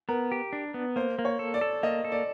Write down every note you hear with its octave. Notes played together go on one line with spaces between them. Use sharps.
B3 A#4
G4
D4
B3
A#3 C5
A#3
C#5
A4
D5
A4
A#3 D#5
A4
D5